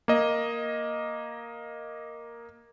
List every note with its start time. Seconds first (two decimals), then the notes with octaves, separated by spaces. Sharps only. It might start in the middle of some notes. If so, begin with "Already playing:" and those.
0.08 A#3 D#5